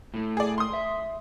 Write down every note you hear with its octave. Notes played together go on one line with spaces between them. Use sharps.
A2 A3
G#4 D5
C6 D#6
E5